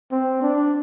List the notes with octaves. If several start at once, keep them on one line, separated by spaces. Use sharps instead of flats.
C4
D4